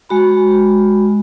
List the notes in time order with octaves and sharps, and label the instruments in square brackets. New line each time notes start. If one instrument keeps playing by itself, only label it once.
[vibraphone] G#3 F#4 B5